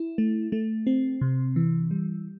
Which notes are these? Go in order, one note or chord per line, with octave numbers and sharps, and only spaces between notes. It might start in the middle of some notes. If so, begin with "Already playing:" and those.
Already playing: E4
A3
A3
C4
C3
E3
G3